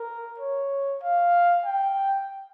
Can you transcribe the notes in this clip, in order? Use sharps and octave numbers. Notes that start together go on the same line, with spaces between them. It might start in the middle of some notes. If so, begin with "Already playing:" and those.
Already playing: A#4
C#5
F5
G5